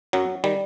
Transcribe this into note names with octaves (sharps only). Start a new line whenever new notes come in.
F#2 F#3
D#3 G3